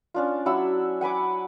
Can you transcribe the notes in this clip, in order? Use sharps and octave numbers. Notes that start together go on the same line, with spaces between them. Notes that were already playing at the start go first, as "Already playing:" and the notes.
C#4 D4 F4
F#3 E4 F#5 E6
F#5 G#5 B5 D6